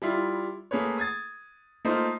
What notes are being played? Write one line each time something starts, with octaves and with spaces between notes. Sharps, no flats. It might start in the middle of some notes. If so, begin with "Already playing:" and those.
G3 E4 F4
A3 A#3 G#4 B4 C#5
D#6 G#6 A6
A3 A#3 D#4 F4 C5 D#5